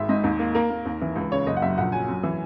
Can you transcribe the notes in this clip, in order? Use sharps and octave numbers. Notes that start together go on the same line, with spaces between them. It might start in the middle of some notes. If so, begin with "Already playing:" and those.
Already playing: G#1 G#3 E5
G#2 D#5
D#2
A#3
A#3 A#4
A#3
D#2
E3
C#2
C#3 C#5
F#1 D#5
F#5
F#2 E5
A#1 F#5
F#3 G#5
F#2
E3